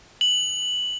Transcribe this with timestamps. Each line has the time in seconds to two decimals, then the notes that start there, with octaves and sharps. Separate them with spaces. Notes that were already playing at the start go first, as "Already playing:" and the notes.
0.21 F#7